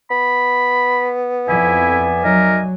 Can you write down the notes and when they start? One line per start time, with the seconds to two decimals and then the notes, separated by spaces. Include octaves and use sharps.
0.11 B3 B5
1.48 F2 E4 D5 E5 G#5
2.24 F#3 D#4 A#4